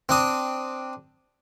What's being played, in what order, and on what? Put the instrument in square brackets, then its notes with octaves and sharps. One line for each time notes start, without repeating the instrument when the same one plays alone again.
[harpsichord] C4 D4 D#6